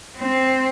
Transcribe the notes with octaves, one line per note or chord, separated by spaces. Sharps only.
C4